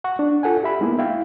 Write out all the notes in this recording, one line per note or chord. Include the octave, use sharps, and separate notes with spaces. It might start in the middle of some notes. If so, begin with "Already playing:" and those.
F#5 C#6
D4
F4 A4 F#5 G#5
G4 E5 B5
G#3 A#3 B3 D#4 E4
E4 F5 G5